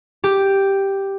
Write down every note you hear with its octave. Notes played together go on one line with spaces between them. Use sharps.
G4